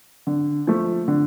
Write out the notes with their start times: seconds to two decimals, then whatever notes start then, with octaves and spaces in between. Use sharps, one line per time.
0.27 D3
0.67 F3 A3
1.08 D3